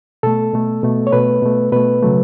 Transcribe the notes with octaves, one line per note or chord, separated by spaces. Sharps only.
B2 A3 A4
B2 A3
B2 A3
C#5
B2 A3 B4
B2 A3
B2 A3 B4
C#3 F#3 A3